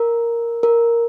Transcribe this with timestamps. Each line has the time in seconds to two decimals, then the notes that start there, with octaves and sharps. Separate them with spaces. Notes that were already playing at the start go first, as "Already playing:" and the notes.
Already playing: A#4
0.63 A#4